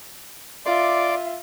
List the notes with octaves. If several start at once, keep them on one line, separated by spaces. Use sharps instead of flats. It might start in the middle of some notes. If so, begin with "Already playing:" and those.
F4 D5 E5 C6 D6